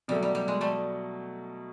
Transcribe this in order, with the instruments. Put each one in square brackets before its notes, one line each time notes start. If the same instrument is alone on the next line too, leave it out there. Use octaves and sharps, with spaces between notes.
[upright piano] B2 F#3 A3 [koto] G3
[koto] G3
G3
G#3
G3 A3